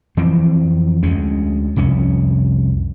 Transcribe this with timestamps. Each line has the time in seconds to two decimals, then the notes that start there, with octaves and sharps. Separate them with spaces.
0.17 F2 E3 F3 C4
1.03 D2 G#3 C#4
1.76 C2 F2 C#4